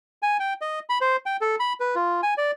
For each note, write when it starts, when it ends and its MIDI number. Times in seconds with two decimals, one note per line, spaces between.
0.22 0.37 80
0.40 0.54 79
0.61 0.79 75
0.90 0.98 83
1.01 1.16 72
1.26 1.37 79
1.41 1.56 69
1.60 1.73 83
1.80 1.95 71
1.95 2.21 65
2.23 2.34 80
2.37 2.51 74